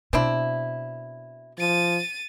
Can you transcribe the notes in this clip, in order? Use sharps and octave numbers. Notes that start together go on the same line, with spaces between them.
B2 C4 D4 E4
F3 A6 D#7